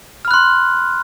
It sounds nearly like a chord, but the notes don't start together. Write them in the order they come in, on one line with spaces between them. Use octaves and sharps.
F6 B5 F#6 C6